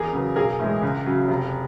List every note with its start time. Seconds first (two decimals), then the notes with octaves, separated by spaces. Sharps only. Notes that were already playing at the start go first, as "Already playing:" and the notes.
Already playing: E2 G#4 A#4
0.13 C#3 F#3 B3
0.36 B1 G#4 A#4
0.60 A2 E3 G#3
0.82 C#2
1.06 C#3 F#3
1.28 F1